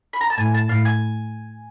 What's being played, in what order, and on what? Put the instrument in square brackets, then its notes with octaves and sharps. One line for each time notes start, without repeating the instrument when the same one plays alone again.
[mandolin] B5
A#5
A5
[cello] A2 [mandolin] G#5
[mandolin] A5
[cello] A2 [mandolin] F5
[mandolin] G#5